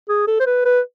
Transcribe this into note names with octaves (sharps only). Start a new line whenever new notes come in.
G#4
A4
C5
B4
B4